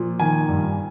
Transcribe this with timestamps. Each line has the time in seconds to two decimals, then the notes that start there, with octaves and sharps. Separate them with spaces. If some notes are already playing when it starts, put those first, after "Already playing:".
Already playing: A#2 F3
0.20 D#3 G#5
0.49 G2